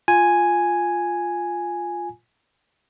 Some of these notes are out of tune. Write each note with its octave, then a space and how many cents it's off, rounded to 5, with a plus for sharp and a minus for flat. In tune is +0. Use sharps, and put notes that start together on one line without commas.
F4 +0 G#5 +0